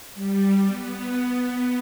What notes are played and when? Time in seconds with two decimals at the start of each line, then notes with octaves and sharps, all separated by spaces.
0.14 G3
0.65 B3